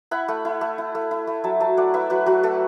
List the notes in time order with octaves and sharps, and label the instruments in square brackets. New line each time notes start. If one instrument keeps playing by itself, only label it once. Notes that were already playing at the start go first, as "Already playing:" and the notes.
[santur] E4 F#5 B5
A3
E4
A3
E4
A3
E4
A3
F#3 E5 A5
F#3 E5 A5
A3 D5 F#5
E4 B4 E5
F#3 F#4 B4
F#3 F#4
A3 A4